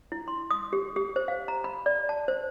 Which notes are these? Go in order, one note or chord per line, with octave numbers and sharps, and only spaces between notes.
E4
C6
D#6
G4
G4
C5
F5
A#5
B5
D5
A5
C5